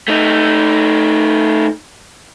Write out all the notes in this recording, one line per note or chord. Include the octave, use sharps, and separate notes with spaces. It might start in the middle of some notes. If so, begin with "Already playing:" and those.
A3 D#4